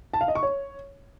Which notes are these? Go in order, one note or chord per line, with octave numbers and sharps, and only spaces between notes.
A5
F5
D#5
C#6
C#5